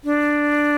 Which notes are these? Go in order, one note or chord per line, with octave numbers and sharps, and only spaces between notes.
D4